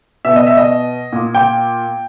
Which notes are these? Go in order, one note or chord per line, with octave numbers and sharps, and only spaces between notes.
B2 E5
D#5
E5
D#5
A#2
G5